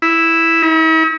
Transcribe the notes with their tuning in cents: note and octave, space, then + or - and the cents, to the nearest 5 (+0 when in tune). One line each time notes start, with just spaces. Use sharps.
E4 +0
E4 -45